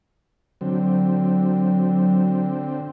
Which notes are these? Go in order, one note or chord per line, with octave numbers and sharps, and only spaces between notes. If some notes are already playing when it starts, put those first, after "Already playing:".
D3 F#3 C4